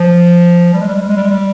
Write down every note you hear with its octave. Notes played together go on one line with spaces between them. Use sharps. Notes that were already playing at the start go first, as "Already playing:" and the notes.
Already playing: F3
G3
G#3
G3
G#3
G3
G#3
G3
G#3
G3